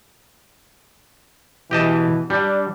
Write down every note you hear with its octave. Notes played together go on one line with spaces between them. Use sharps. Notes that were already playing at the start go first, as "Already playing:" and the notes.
B2 E3 G4 D#5 A5
G3 D4